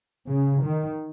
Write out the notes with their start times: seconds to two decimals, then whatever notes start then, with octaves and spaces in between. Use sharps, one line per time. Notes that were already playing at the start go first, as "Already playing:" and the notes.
0.27 C#3
0.63 D#3